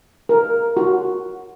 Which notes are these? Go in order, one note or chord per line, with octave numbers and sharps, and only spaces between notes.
A#4
F#4